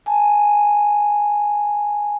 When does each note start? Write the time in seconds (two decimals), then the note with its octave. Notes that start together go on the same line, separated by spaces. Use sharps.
0.06 G#5 A5